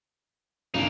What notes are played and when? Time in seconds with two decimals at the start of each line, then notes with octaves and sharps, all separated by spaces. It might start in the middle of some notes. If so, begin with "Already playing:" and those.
0.74 B1 G2 C#3 A#3 D#4